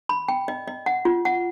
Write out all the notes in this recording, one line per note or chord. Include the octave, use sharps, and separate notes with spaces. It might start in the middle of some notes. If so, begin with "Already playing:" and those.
B5
G5
D#5
D#5
F#5
F4
F#5